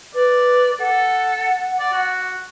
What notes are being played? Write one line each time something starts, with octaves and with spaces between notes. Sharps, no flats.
B4 D5
A4 F#5
D5
F#4